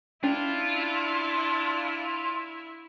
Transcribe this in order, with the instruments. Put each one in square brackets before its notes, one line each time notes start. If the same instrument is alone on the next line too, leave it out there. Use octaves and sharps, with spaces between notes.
[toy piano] C#4 [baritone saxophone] D4 [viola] E4 [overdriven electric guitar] F4